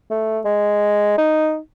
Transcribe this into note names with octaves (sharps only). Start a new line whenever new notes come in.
A3
G#3
D#4